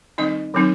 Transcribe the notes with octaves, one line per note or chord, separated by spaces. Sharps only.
D#3 G3 C4 D#4 D#5
D#3 F#3 C4 D#4